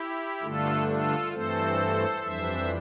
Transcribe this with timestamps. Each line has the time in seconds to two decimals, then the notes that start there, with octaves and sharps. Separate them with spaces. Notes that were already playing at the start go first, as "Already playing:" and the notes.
Already playing: E4 G4
0.42 G2 D3 A3 D4 F4 A4
0.87 F4 A4
1.33 G2 E3 A3 C4 A4 C5
2.23 F2 E3 G3 D4 C5 E5